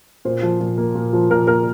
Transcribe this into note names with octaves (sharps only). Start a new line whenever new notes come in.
A#2 C5
F3
A#2
A#3
A#2
F3
A#2 A#4
A#3 A#4